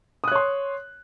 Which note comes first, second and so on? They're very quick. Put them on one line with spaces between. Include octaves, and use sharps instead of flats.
D#6 F#6 C#5 C6